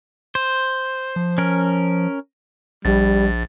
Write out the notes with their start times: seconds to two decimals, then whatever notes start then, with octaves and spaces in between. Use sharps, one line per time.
0.35 C5
1.16 F3
1.38 C#4 A#4
2.85 A#1 G3 A6